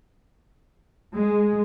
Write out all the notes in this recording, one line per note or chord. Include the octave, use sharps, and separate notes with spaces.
G#3